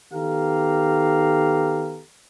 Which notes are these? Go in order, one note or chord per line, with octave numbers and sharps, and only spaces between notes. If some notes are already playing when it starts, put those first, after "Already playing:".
D#3 B3 G4 A4 F5 A#5